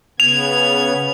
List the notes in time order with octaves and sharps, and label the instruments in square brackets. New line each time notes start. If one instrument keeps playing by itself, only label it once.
[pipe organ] C#3 B3 G#6 [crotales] F7